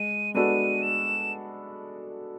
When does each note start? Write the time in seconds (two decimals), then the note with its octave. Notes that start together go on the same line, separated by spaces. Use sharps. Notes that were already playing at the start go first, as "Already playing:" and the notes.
Already playing: G#3 D#7
0.34 G#3 B3 D4 F#4 A4 D#7
0.82 E7